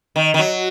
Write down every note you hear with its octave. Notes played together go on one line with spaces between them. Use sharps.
D#3
D#3
F#3